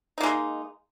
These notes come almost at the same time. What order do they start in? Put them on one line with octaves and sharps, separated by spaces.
D#4 A#3 G#3